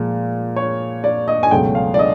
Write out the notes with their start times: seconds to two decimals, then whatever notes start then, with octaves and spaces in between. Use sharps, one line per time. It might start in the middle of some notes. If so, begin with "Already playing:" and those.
Already playing: A#2 F3 G#3
0.56 C#5
1.04 D5
1.28 D#5
1.43 G#5
1.51 C#2 B2 F#3 A3 G5
1.75 F5
1.94 D5
1.99 D#5